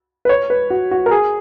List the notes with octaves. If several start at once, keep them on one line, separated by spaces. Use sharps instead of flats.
B4
C#5
B4
F#4
F#4
A#4
G#4